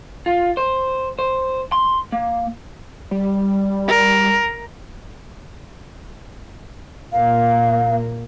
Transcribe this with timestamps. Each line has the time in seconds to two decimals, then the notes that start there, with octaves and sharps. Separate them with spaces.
0.26 F4
0.57 C5
1.19 C5
1.72 C6
2.12 A#3
3.11 G3
3.88 A#4
7.13 A#2 A#3 F5